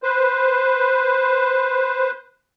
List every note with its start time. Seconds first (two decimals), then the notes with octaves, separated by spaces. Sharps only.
0.03 B4 C5